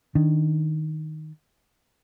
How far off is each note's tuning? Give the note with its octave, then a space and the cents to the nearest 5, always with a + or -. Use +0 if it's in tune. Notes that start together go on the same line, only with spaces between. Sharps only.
D#3 +0 D4 +0